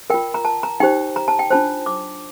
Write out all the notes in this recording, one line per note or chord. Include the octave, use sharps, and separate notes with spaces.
F4 A#4 G5
A#5
A5
A#5
D#4 G4 C5 G5
A#5
A5
G5
D4 F4 C5 A5
D6